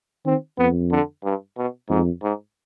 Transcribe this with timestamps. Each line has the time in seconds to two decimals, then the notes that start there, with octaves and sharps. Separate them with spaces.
0.26 D#3 C4
0.58 F2 B3
0.92 D3
1.24 G2
1.57 B2
1.89 F2 G#2
2.22 G#2